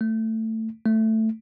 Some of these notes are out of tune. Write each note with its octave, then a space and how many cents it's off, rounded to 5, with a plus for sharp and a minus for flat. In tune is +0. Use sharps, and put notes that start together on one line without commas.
A3 +15
A3 +5